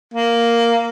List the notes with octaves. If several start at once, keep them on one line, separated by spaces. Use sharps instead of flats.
A#3